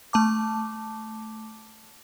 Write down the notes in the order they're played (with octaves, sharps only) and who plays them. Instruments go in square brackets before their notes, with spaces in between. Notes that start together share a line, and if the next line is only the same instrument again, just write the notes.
[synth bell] A3 A5 D6